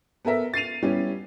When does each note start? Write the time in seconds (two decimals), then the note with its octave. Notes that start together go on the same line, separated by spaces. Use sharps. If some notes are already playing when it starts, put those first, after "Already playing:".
0.25 B3 A4 A#4 E5
0.54 A6 C7 D#7 F7
0.83 G3 B3 C#4 E4 G4